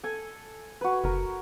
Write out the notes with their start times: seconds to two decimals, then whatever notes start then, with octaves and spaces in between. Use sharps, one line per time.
0.03 A4 G#5
0.81 F#4 B4
1.04 F#1 A#4